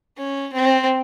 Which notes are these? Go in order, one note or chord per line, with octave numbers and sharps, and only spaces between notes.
C#4
C4